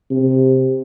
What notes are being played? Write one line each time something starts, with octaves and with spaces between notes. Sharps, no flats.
C3